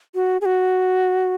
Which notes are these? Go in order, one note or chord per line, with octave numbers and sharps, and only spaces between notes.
F#4
G#4
F#4